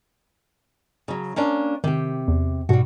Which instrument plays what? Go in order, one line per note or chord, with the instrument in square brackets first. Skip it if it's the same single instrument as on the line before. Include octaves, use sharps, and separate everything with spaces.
[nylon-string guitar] C#3 F#3
A#3 C#4 D4
[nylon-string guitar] C3 G4 [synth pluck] D#3
[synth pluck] E2
[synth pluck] G#2 B2 [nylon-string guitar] G3 F#4